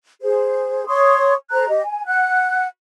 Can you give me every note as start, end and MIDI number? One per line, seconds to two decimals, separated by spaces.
0.21 0.83 68
0.21 0.83 72
0.87 1.33 73
0.87 1.33 84
0.87 1.33 85
0.87 1.33 87
1.51 1.67 69
1.51 1.67 72
1.51 1.67 82
1.51 1.67 90
1.69 1.81 67
1.69 1.81 75
1.83 2.06 80
2.06 2.66 78
2.06 2.66 90